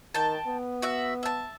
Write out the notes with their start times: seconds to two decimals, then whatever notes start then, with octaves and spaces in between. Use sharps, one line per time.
0.15 D#3 G5 A5
0.47 B3
0.82 F#4 E5 F#5
1.23 E5 A5